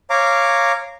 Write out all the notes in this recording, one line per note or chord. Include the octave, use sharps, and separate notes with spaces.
C#5 F5 A#5 D6